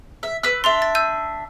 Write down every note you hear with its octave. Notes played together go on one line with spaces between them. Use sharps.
E5
B4 E6
D4 E5 C6 F7 G7
A6
E6 G6 D#7